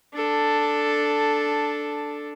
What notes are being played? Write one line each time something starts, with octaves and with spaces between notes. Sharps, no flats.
D4 A4